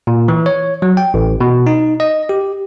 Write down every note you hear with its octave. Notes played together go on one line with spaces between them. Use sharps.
A#2
E3
C#5
F#3
G5
A1
B2
D#4
D#5
G4